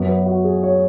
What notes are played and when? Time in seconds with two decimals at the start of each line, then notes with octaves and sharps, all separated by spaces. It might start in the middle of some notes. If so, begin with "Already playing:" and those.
Already playing: F#2 F#3 B3
0.09 B4
0.26 F#4
0.44 G#4
0.63 C#5